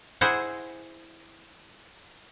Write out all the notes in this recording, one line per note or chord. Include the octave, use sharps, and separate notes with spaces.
E4 G#4 C5 F#5